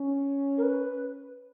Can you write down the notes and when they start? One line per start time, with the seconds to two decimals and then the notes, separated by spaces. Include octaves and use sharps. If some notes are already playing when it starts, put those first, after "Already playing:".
Already playing: C#4
0.57 A#4
0.63 B4